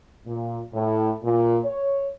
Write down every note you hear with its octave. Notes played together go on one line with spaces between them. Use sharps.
A#2
A2
A#2
C#5